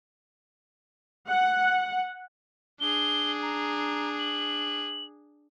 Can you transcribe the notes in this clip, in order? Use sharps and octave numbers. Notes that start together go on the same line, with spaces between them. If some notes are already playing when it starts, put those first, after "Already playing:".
F#5
D4 G#4 G7
A#5
F#7